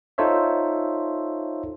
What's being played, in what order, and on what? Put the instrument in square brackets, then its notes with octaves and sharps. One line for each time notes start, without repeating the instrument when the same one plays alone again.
[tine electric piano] D#4 F4 A4 C5 C#5 E5